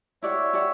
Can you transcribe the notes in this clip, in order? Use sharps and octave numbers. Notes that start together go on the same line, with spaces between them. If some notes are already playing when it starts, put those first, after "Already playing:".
E4 G4 C#5 D5 E5 F#5
E4 G4 D5 F#5